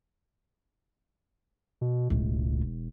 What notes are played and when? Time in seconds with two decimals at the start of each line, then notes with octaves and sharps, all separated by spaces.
1.81 B2
2.10 E1 C#2 A2